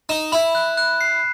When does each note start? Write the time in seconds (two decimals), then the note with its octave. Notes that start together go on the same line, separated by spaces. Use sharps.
0.09 D#4 E7
0.32 E4 B5
0.55 F#6
0.77 F#6
1.01 C7